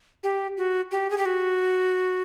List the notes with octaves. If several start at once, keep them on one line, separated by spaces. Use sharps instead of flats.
G4
F#4
G4
G#4
G4
F#4